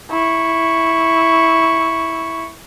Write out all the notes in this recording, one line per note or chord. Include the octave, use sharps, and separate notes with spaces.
E4 C#6